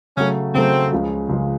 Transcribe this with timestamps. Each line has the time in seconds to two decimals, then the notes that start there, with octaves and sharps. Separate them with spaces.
0.17 C#3 F#3 A3 C#4
0.54 C#3 F#3 A3 C4
0.92 C#2 C#3 F3 G#3
1.29 C#2 C#3 F3 G#3